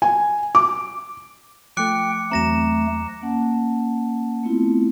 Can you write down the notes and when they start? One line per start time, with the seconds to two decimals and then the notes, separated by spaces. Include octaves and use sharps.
0.02 G#5
0.55 D6
1.77 F3 A3 G5 D6 F#6 C#7
2.31 E2 F#3 A3 C4 A#5 A#6 E7
3.21 A#3 C#4 F#5 A5
4.44 A3 B3 C4 E4 F4